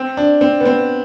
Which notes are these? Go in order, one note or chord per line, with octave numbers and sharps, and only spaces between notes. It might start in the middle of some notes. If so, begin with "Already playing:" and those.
Already playing: C4
D4
C4
B3
C4